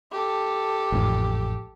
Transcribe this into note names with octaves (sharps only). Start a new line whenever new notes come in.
G4 A4
A1 F2 G#2